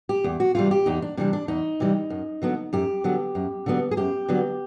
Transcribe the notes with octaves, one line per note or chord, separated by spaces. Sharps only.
G4
E2
F#4
C3 E3 G3 F4
G4
E2 D#4
D4
C3 E3 G3 D4
D4
E2 D#4
C3 E3 G3
F#2
D3 F#3 B3
F#2 G4
D3 F#3 B3
F#2
D3 F#3 B3
G#4
F#2 G4
D3 F#3 B3